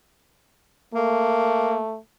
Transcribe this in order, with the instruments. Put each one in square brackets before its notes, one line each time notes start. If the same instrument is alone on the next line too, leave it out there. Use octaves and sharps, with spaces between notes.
[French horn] A3 [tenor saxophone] A#3